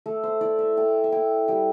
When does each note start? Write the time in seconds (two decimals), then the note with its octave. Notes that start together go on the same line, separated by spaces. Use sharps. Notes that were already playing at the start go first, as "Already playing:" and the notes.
0.06 A3 A4
0.23 C5
0.41 E4 D5
0.59 E5
0.77 A3 G5
1.04 E5
1.12 E4 G5
1.48 G3 G5